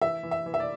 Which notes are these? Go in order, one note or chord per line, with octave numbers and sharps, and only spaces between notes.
E3 E5
E3
E5
E3
E5
D5